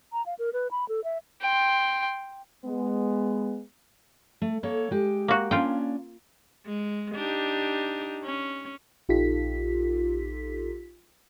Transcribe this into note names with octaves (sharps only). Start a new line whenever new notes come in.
A#5
F5
A#4
B4
B5
A4
E5
G5 C6
G#3 B3
A3
A#3 A4 C#5
G#3 G4
A#3 F#4
A#3 C#4 D4 F4 G5
G#3
D4 D#4 G4
C#4
A#1 D#4 F4 G4 A4 B6